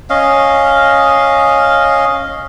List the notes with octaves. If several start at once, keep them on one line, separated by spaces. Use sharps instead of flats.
C#4 D#5 F5